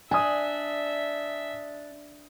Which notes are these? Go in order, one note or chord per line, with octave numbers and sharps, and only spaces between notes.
D4 E5 G#5 D#6